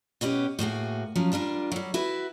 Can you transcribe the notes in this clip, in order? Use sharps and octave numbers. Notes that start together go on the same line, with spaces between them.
B2 B3 C#4 G4
A2 A#3 F#4 G#4
F3 F#3 C#4
G3 D4 F4 A#4
F#3 G3
E4 F#4 B4